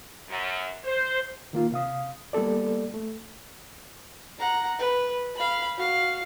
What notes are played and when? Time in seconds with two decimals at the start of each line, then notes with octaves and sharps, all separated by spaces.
0.29 F#2
0.85 C5
1.53 D#3 A#3 F4
1.72 C3 F5 D#6
2.33 G3 A#3 B3 A4 D5
2.94 A3
4.39 F#5 A#5
4.79 B4
5.35 F5 B5
5.78 F#4 F5